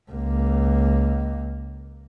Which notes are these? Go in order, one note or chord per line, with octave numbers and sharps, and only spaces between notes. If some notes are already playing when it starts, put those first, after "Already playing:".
C#2 A#3